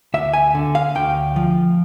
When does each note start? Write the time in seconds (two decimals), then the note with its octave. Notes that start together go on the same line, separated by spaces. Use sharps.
0.14 D2 E5
0.33 G#5
0.55 D3
0.75 F5
0.95 D2 G5
1.36 F3